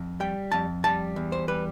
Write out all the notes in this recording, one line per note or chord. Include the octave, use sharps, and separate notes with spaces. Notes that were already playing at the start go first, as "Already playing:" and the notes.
Already playing: F2
G3 G5
F2 A5
G3 A5
E2
C5
G3 B4